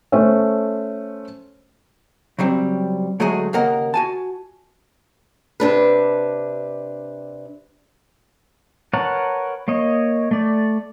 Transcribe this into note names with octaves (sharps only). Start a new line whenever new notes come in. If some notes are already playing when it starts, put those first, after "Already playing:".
A3 C#4 A4 C5
C#3 F#3 G3 C4
D3 F#3 G#3 A3 F#4 G#4
D#2 C#3 A#3 A#4 D#5 F#5
F#4 G#5 A5
C3 D4 B4
A#4 B4 C#5 F#5 A5
A#3 C#5 D#5
A3 D5